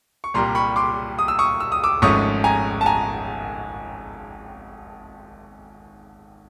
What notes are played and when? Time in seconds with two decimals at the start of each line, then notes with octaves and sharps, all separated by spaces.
0.24 C#6
0.34 C2 A#2 G3 A#5 C6
0.55 B5 C#6
0.76 C6 D6
1.19 D#6
1.28 E6
1.39 C#6 D#6
1.60 E6
1.72 D#6
1.84 D6 E6
2.02 G#1 G#2 F3 A3 C#4 C#6 D#6
2.44 G#5 A#5
2.81 A5
2.86 G#5 A#5